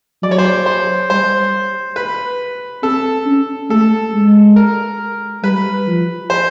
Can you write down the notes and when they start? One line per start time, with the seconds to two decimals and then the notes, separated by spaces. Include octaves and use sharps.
0.23 F#3 D5
0.31 C#5
0.38 C5
0.45 C#5
0.66 C5
1.10 G3 C5
1.96 B4
2.83 C4 A4
3.26 C#4
3.70 A3 A4
4.14 G#3
4.56 A#4
5.44 G3 B4
5.88 F3
6.30 C5